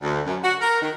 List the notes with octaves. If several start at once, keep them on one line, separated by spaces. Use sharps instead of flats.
D2
F#2
F#4
A#4
D#3